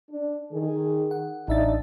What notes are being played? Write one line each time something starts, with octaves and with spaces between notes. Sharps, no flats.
D4
D#3 G#4
F#5
A1 D4 D#4 E5 A6